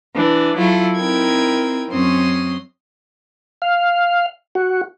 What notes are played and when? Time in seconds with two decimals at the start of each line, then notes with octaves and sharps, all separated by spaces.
0.15 E3 D4
0.57 F#3 E4 F4 A4
0.96 C4 D#4 E4 A#4 G5 G#6
1.88 F#2 C4 C#4 C6 D#6
3.62 F5
4.55 F#4